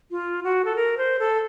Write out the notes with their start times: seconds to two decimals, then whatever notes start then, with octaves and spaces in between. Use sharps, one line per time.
0.11 F4
0.44 F#4
0.65 A4
0.76 A#4
0.98 C5
1.19 A4